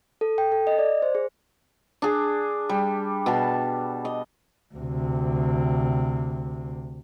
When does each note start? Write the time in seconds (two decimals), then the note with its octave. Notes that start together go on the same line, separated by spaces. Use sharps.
0.21 A4
0.38 G5
0.52 A4
0.67 D#5
0.79 D5
1.02 C5
1.15 G#4
2.02 D4 G#4
2.69 G3
3.26 B2 A5
4.05 D#5
4.75 D2 C3